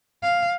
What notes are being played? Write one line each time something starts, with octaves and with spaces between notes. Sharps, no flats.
F5